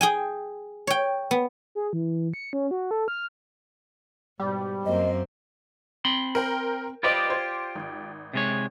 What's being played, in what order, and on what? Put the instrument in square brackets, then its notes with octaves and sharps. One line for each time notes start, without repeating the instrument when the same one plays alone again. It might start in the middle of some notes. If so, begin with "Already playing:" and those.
[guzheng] G#4 G5 G#5
C#5 G5
B3
[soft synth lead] G#4
E3
C#7
C#4
F#4
A4
F6
[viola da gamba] G#2 B2 [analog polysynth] G3
[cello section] F#2 A#3 [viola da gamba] C4 C5 [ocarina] D#5
[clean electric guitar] C4 B5 C6
[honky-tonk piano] A#4 C5 G5
[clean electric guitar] F4 G4 D5 [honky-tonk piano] B4 C5 D#5
[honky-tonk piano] C5 G#6
G#1
[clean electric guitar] C3 G#3 C#5